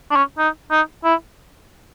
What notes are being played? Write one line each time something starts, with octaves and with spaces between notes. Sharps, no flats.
D4
C#4
D#4
D#4
E4